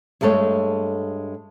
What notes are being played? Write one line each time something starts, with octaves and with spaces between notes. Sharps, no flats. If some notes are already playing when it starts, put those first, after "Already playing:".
G2 G#3 A3 A4 C#5